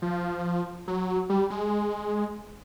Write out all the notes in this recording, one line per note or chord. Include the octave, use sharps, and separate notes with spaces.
F3
F#3
G3
G#3